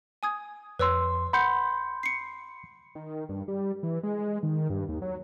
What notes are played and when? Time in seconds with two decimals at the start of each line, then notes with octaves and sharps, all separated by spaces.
0.23 G#5 D#6 G#6
0.79 F2 B4 C#5 C6 E6
1.33 F#5 B5 C6 G6 C#7
2.03 C7 C#7
2.95 D#3
3.29 G2
3.48 G3
3.83 E3
4.03 G#3
4.43 D#3
4.70 G2
4.89 D#2
5.02 F#3